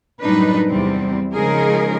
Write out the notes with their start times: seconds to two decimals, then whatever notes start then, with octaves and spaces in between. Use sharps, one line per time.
0.21 F#2 A2 G3 D4 D#4 B4
0.67 E2 C3 G3 C4
1.33 C#3 F3 G#3 D#4 G#4 A#4